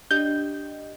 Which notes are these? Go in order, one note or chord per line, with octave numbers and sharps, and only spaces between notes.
D4 G4 D#5 G6